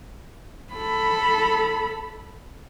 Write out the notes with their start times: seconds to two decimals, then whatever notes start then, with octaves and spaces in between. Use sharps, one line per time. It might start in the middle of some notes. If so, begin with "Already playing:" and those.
0.73 A4 B5